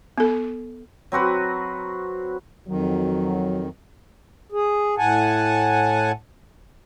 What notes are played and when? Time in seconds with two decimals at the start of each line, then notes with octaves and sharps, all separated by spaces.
0.18 B3 A4
1.12 F#3 C4 F#4 B4
2.68 F2 D#3 F#3
4.52 G#4
4.98 A2 F#5 G#5 A5